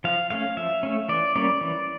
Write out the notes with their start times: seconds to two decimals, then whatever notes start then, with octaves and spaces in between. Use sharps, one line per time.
0.04 F3 F5
0.30 A3 C#4 F5
0.57 F3 E5
0.83 A3 C#4
1.09 E3 D5
1.36 G3 A#3 C#4 D5
1.61 E3